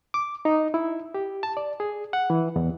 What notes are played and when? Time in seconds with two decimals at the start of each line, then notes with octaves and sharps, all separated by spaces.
0.14 D6
0.45 D#4
0.74 E4
1.14 G4
1.43 A5
1.57 D5
1.80 G#4
2.13 F#5
2.30 E3
2.56 E2